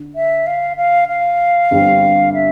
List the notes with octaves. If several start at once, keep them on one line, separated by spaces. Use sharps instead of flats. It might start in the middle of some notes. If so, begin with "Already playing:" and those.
Already playing: D3
E5
F5
F5
F5
G1 G2 D3 G3 C4
E5